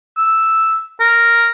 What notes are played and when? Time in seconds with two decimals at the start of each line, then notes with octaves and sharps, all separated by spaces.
0.17 E6
1.00 A#4